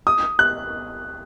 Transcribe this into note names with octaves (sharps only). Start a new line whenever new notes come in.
D#6
F#6